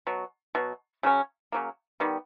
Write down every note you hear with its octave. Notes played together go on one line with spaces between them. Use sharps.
B2 F#3
B2 F#3
C#3 F#3 C#4
C#3 F#3 A#3
D#3 G3 B3